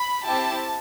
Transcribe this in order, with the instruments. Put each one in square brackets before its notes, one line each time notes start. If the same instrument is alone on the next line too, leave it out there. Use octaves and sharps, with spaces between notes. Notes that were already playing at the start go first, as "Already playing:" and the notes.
Already playing: [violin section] B5
C4 E4 G4 A5